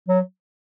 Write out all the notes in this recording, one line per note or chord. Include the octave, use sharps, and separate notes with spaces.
F#3